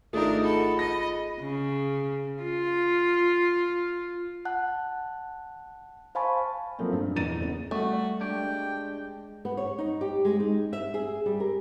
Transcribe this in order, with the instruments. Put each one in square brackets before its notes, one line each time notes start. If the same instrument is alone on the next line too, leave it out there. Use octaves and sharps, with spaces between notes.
[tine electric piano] G#1 F4 G#4 [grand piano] A3 D#4 [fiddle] D4 A#4 [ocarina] D#6
[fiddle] F#4 A4 [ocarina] B5
[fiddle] D#5 [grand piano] A#6
[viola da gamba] C#3
F4
[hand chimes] F#5 A5 F#6
C5 F5 G#5 A5 B5 C#6
[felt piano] F3 F#3 A3 A#3 C4
G2
E2 A#5 A6 D#7
C#3 B3
[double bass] G3 [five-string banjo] A3 [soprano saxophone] F#4
[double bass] G#3 [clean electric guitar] D4 G4 [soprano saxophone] G5
[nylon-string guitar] B3
C#5
D#4
G4
G#3
D#4
E5
G#4
G3
A#4